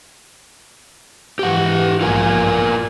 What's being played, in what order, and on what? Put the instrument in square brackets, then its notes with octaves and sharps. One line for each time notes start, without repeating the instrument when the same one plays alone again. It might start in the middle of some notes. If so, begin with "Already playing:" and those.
[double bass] G#2 E3 [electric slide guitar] G4 F#5
[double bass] A#1 G#2 [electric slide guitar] F4 A#4 G#5
[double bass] G2